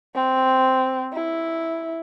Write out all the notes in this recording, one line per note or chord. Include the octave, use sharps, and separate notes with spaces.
C4
E4